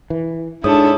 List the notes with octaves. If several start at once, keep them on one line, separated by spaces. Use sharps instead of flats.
E3
G#2 D4 E4 G#4 A4 C#5 D#6